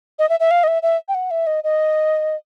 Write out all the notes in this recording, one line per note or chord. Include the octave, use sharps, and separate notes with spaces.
D#5
E5
E5
F5
D#5
E5
E5
G5
F#5
E5
D#5
D#5